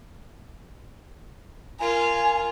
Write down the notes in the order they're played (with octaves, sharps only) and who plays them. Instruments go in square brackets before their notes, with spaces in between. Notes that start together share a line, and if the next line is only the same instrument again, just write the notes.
[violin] F4 A#4 [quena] G#5